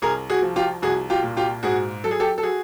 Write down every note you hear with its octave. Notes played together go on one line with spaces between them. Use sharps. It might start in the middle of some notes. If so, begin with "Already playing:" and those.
C2 G#4 A#4
F#4 G#4
F3
F4 G4
C2 F#4 G#4
F4 G4
A#2
F4 G4
G#2 F#4 G#4
F#3 A4
G#4
G4 A4
A4
F#4 G#4